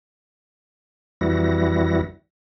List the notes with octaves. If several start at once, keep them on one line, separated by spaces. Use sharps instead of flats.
F2 E3 G3 E4 F#4 A#6